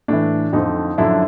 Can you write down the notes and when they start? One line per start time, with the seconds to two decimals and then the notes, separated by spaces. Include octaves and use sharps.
0.08 A2 E3 D4
0.53 F2 D3 F3 D#4
0.98 F#2 D3 F3 D4 E4